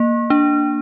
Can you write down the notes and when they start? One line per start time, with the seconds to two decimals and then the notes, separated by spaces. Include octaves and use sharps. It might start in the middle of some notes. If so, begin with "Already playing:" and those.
Already playing: A#3
0.30 D4